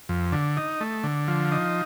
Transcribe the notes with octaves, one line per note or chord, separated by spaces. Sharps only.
F2
D3
D#4
A3
D3
F3
D#4